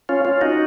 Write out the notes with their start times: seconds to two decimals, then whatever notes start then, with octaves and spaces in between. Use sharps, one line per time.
0.09 C#4 F4
0.25 C#4 F4
0.41 D#4 F#4